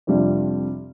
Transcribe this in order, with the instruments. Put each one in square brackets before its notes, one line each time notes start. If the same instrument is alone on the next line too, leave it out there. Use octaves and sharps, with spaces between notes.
[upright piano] F2 C3 G3 D4 F4